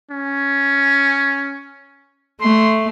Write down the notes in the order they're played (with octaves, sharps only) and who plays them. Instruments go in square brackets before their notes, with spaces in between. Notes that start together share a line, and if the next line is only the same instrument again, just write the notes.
[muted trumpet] C#4
[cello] A3 [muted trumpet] C6